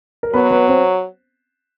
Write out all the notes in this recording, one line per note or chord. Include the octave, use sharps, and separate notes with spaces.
A#4
F#3 B3 B4
B3 B4
C4 C5